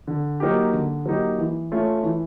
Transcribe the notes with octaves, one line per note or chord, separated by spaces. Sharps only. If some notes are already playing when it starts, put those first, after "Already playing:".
D3
F#3 A#3 D#4 G4
D3
F#3 A#3 D#4 G4
E3
A3 C#4 F4
E3